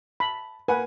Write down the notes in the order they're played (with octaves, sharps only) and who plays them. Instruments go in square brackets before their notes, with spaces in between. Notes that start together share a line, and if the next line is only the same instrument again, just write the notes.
[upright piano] A5 [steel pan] B5
[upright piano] A#3 F#5 G#5 [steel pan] B4